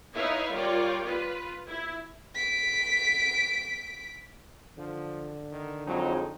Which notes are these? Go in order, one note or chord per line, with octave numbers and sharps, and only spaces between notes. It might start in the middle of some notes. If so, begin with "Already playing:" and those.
D#4 E4 B4 C#5 E5 F5
G3 F4 A#4 C#5 D5 G5
F4 B4
E4
B6 D7
D3 F3
D#3
F2 F#3 G#3 D#4